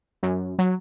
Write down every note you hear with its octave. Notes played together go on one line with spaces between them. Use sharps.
F#2
F#3